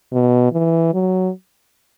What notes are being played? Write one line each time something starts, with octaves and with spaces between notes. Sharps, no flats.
B2
E3
F#3